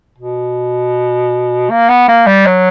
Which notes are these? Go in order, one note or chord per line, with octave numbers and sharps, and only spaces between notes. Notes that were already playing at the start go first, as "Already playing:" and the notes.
B2
A#3
B3
A#3
G3
F#3